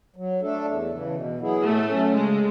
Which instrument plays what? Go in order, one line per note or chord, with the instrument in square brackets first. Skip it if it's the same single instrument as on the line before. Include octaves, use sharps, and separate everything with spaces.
[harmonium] F#3
A3 D4 A4
E2
C#3 E3
B2
F#3 B3 E4 G#4
[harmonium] A2 [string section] A3
[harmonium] F#3 C#4
[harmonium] C#3 [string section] G#3